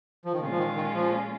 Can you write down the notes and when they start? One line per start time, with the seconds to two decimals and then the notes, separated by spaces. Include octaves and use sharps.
0.25 F3
0.33 D#3
0.40 A#2 C#3 G#3 C#4 F4
0.51 F3
0.58 D#3
0.76 D#3
0.95 F3